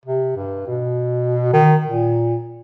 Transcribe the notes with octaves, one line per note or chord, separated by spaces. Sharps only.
C3
G2
B2
D#3
A#2